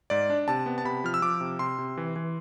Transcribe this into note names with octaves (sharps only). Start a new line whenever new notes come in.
G#2 D5
D4
C3 A5
B3
A5
C3 B5
F3 F6
E6
F3 D6
C3
C3 C6
C3
E3
E3